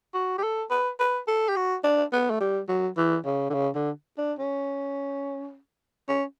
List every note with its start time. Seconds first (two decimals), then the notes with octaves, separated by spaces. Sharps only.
0.14 F#4
0.38 G4
0.43 A4
0.71 B4
1.00 B4
1.28 A4
1.49 G4
1.56 F#4
1.84 D4
2.13 B3
2.31 A3
2.41 G3
2.69 F#3
2.98 E3
3.26 C#3
3.50 D3
3.54 C#3
3.75 D3
4.18 D4
4.39 C#4
6.09 C#4